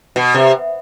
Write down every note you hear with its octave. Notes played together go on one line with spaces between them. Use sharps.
B2
C3